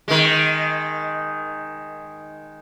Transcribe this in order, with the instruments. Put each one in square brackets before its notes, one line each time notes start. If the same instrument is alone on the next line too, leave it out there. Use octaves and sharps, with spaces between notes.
[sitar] D#3 G#3